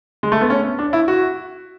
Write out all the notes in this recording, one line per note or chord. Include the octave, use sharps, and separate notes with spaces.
G#3
A3
B3
C#4
D4
E4
F#4